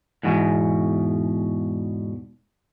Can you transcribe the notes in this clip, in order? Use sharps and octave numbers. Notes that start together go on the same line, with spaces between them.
E2 G#2 B2